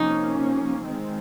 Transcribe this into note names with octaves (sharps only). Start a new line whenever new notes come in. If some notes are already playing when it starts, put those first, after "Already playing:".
Already playing: C3 F3 A#3 C#4 D#4
D#3 G#3 C4